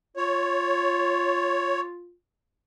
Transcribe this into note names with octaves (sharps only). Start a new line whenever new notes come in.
F4 C#5